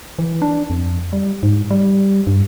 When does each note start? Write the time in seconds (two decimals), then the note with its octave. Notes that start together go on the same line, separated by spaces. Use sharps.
0.19 E3
0.42 D4
0.70 F2
1.13 G3
1.43 G#2
1.71 G3
2.27 G2